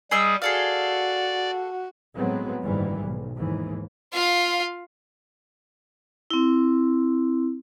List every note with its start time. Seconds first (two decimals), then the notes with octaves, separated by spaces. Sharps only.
0.11 G3 G#4 D#5 E6
0.42 F#4 G#4 A4 D5 F5
2.15 A2 F#3 G#3 B3 C4
2.62 F#1 G#2 D#3 E3 G3
3.01 B1
3.35 D#2 G#2 E3
4.13 F4 F5
6.30 C4 E4